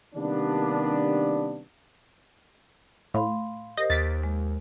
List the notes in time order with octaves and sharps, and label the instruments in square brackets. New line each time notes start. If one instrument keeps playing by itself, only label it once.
[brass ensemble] C3 D#3 G3 A#3 B3 D4
[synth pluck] A2 [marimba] F5 B5 C6
[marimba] G4 A#4 C5 [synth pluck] D#5
[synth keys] D#2 [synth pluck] A6 B6 D7
[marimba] G#3